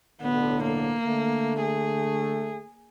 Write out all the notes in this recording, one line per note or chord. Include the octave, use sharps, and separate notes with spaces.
B1 A2 D3 B3
A#3
D3 A3
G#4